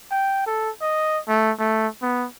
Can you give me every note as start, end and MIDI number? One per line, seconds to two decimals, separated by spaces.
0.11 0.42 79
0.46 0.70 69
0.81 1.18 75
1.28 1.51 57
1.59 1.87 57
2.02 2.26 59